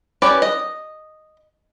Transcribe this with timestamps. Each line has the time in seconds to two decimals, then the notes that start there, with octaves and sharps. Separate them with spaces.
0.22 C#4 G4 B4 D5
0.42 D#5